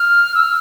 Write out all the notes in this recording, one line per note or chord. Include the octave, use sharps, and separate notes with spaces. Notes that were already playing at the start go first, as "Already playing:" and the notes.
Already playing: F6
E6
F6